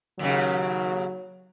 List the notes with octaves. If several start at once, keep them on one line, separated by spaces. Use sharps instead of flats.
D#2 C#3 F#3